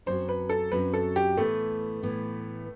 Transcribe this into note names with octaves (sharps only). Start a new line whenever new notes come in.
F#2 F#3 C4 F#4 C5
B4
A4
F#2 F#3 C4 F#4 B4
A4
G4
A2 E3 A3 B3
A2 E3 B3